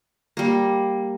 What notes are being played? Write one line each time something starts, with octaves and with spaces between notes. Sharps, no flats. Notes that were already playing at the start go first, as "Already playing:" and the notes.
G3 A#3